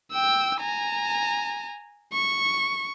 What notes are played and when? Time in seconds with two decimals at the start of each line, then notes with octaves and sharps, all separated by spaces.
0.12 G5 E6
0.61 G#5 A#5
2.13 C#6